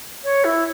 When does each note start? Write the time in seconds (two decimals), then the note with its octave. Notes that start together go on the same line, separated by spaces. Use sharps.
0.24 C#5
0.44 E4